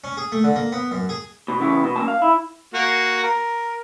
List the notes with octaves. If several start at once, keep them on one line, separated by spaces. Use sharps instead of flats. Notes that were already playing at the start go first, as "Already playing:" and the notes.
C#4
G#4
A3
D3
A#3
B3
F#2
G#4
B2
C#3 E3 B3
B2
F#2 A#3 A5
F5
E4
A#3 F#4
A#4